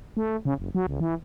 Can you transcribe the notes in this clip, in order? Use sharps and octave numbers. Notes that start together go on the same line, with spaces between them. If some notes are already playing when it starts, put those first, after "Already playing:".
A3
C#3
F#1
F#3
C#2
E3